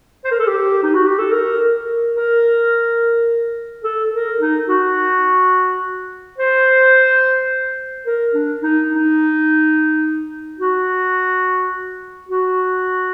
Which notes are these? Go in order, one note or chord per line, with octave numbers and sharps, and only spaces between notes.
C5
A#4
A4
G4
D#4
F#4
G4
A4
A#4
A#4
A#4
A4
A#4
D#4
F#4
C5
A#4
D4
D#4
D#4
F#4
F#4